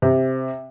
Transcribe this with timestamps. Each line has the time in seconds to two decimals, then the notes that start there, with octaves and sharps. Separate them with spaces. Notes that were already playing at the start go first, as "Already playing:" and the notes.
0.02 C3